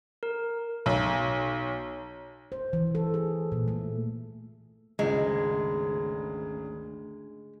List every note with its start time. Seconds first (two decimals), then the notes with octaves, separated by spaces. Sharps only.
0.23 A#4
0.86 B1
2.52 C5
2.73 E3
2.95 A4
3.14 G#4
3.52 A#2
3.68 A3
4.99 G#1 D2 C#3 G#3